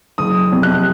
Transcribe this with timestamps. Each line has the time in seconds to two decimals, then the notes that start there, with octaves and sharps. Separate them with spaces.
0.18 F#1 D#6
0.52 F2 C3
0.63 F#6